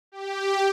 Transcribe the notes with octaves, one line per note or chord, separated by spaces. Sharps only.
G4